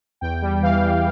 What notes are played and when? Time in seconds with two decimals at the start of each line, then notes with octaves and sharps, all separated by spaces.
0.21 E2 G5
0.42 G3
0.62 E3 F5
0.83 E3